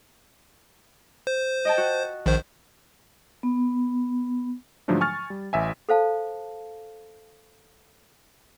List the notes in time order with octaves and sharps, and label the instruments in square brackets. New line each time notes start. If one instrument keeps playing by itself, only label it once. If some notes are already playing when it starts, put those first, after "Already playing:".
[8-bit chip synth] C5
[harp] D#5 G5 A5
F#4
[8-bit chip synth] A#1 D#3 C5
[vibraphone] B3
[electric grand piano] G#2 D3 F3 F#3 A3 D4
G#5 C#6 F6 A6
G3
A1 E5 G#5
[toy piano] A4 C5 F5 A5